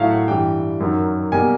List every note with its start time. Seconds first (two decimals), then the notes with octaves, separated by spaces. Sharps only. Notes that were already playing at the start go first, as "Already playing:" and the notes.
Already playing: A2 F#3 A3 E5 F5
0.10 F#5
0.28 G2 E3 G3 G5
0.80 F#2 D#3 F#3
1.32 B2 G3 A#3 G#5